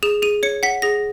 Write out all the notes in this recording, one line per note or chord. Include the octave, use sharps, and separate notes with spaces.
G#4 E7
G#4 D#7
C#5 C#7
F#5 B6
G#4 A#6